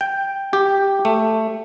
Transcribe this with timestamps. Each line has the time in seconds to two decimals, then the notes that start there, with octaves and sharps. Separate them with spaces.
0.01 G5
0.53 G4
1.05 A3